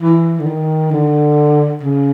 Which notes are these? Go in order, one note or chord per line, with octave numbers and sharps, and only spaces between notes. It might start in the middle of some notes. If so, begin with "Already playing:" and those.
E3
D3
D#3
D3
C#3